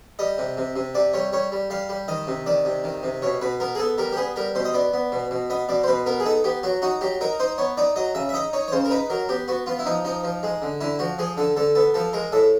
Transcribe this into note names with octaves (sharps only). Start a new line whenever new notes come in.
G3 D#5
C3
C3
C3
C3 D5
G3 C#5
G3 C#5
G3
G3 F5
G3
D#3 D#5
C3
D#3 D5
C3
D#3
C3
B2 C#5
B2 B4
B3 A#4
G#4
B3 A4
G3 A#4
G4
B3 G#4
G3 A#4
B2 C5
D#5
B3 D5
B3
B2
B2
B3 D#5
B2 D5
C5
B2 B4
B3 A#4
G#4
D#4 A4
B3 G4
F#3 F#4
D#4 F#4
F#3 G4
D#4 A#4
D#4 C5
B3 C#5
D#4 D5
F#3 D#5
C#3 E5
E5
D#4 D#5
D#4 C#5
C#5
C#3 C5
A#4
D#4 B4
F#3 A#4
B3 G4
B3 F#4
B3 F4
E4
F3 D#4
F3 D#4
F3
G#3
D3
D3 E4
F3 F#4
F3 G#4
D3 A4
D3 A4
B3 A4
F3 A4
G#3 A#4
A2 A4